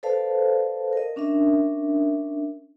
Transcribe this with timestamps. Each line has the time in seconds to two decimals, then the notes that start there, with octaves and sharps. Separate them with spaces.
0.03 A4 B4 C5 D5 F5 A5
0.93 A#4 D#5
1.16 C#4 D4 A#4 E5